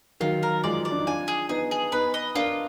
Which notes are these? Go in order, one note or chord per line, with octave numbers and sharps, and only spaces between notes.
D#3 F#3 F4
A#4
F3 G#3 D5
D5
D4
D#4
D4 F4 G#5
G#4
B3 D#4 G#4
G#4
B3 D#4 B4
D#5
A#3 D4 F4